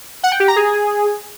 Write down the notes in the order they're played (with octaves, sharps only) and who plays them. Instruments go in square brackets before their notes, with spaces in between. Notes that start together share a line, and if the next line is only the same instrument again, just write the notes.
[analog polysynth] F#5
G5
G4
A#5
G#4